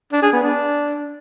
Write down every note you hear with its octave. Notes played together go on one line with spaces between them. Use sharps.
D4
G#4
B3
D4